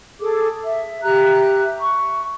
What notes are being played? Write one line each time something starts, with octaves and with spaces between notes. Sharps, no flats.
G#4 A4 D6
E5
G4 E5 A#5 F#6
C#6